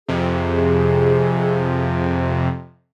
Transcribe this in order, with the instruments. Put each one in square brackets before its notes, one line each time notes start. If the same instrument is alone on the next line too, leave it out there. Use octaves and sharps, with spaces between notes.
[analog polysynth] F2 C3 [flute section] G#4